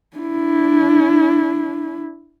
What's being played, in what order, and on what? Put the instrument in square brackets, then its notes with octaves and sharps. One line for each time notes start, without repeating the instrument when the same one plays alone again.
[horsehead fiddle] D4 E4